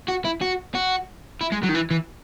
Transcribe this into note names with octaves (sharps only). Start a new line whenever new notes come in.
F#4
E4
F#4
F#4
E4
G#3
F#3
D#3
E3
E3